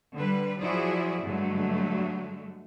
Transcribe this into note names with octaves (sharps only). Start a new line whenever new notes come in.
D3 G3 B4
F3 F#3 E4 F#4 G#4 D5
G2 D3 F#3 G#3 A3